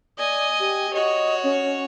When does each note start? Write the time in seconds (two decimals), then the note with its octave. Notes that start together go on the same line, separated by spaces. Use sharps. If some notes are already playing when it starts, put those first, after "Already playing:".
0.18 D5 D#5 G#5
0.60 G4
0.93 F#4 C#5 D#5
1.44 C#4